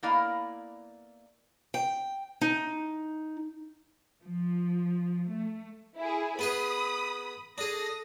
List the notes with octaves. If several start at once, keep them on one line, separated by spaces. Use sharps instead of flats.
A#3 B3 E4 D5 D#5 F5
G5
D#4
F3
A3
E4 G#4
B3 G#4 B4 B5 D#6
D4 G#4 A4 D#6 A#6